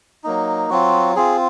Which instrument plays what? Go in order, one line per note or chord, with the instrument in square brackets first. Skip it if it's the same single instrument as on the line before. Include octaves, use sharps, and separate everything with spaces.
[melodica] F#3 A#3 D#4
F#3 C4 F4 F#4
C4 F4 G#4